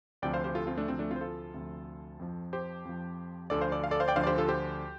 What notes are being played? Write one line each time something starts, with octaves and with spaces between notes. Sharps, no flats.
D2 C3 F3 D5 G5
C5 F5
G4 C5
F4 A4
C4 F4
A3 D4
D2 C3 F3 C4
A3 D4
C4 F4
C5
F4 A4
D2 C3 F3
F2 F3
G4 C5
F2 F3
D2 D3 F3 A4 D5
C5 F5
A4 D5
F5
A4 D5
C5 F5
D5 G5
D2 D3 F3 C5 F5
D5
G4 C5
F4 A4
G4 C5